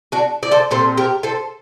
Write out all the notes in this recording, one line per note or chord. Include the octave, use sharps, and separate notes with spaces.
D4 F#4
D5
A4 C5
A#2 G3 C4 A4 C5
G4 A#4
A4 C5